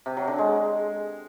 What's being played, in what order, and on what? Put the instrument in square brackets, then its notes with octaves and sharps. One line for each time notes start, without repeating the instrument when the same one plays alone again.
[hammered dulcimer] C3
F#3
D3
G#3